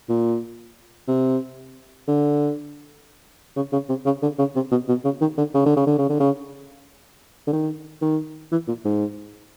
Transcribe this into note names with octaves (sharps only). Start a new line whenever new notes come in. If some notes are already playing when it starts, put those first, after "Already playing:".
A#2
C3
D3
C#3
C#3
C3
C#3
D3
C#3
C3
B2
B2
C#3
D#3
D3
C#3
D3
C#3
D3
C#3
D3
C#3
D3
D#3
D#3
E3
A#2
G#2